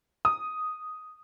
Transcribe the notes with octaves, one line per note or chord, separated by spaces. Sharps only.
D#6